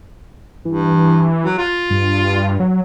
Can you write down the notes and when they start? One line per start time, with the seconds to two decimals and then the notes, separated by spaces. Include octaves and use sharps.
0.65 G2 E3
1.44 F#3
1.58 F4
1.90 G2
2.60 F#3